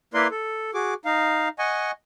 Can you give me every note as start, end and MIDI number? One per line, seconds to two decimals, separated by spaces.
0.14 0.27 58
0.14 0.27 64
0.14 0.27 70
0.14 0.27 71
0.14 0.27 74
0.14 0.27 84
0.31 0.71 69
0.74 0.94 66
0.74 0.94 68
0.74 0.94 86
1.05 1.49 63
1.05 1.49 77
1.59 1.91 75
1.59 1.91 78
1.59 1.91 80
1.59 1.91 85